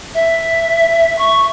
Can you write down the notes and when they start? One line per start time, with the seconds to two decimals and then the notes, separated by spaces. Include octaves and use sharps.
0.14 E5
1.18 C#6